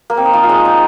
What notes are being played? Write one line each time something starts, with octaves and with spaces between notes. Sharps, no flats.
A#3
C4
D#4
F3 F4
F4
G#3 G#4
D#4